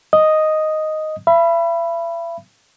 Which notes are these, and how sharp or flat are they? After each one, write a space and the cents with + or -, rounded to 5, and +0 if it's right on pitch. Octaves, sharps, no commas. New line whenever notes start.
D#5 +0 D#6 +0
E5 +40 B5 -5